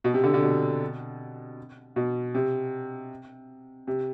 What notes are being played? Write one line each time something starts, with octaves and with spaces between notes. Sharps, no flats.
B2
C3
D3
D3
B2
B2
C3
C3